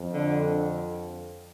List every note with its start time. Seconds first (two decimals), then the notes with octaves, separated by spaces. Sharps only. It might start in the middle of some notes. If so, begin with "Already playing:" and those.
Already playing: F2
0.14 D3